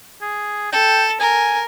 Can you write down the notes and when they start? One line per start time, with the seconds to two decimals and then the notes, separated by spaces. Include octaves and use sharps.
0.22 G#4
0.72 A4 G5
1.20 A#4 G#5